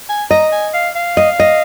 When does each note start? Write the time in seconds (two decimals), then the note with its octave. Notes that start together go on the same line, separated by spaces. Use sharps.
0.09 G#5
0.31 D#5 A#5
0.52 G#5
0.74 F5
0.95 F5
1.17 D#5
1.40 D#5